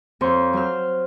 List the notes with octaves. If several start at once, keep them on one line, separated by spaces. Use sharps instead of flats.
F2 F3 C#5 C6
F#3 C5 F6